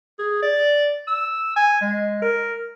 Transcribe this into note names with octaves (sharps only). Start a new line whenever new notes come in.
G#4
D5
E6
G#5
G#3
A#4